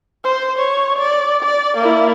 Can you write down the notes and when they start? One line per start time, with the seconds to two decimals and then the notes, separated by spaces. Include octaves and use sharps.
0.24 C5
0.58 C#5
0.99 D5
1.43 D5
1.77 A#3 E4